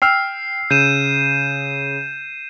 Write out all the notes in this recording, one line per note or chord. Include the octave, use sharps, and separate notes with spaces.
G5 E6 F6 C7
C#3 G6 D#7 E7